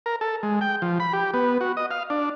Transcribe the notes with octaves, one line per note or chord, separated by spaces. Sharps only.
A#4
A4
G#3
G5
F3
B5
G4
B3
F#4
D#5
F5
D4